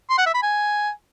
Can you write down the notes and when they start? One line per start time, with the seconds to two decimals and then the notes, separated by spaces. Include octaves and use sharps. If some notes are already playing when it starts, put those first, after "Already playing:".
0.10 C6
0.18 F#5
0.26 E5
0.34 B5
0.42 G#5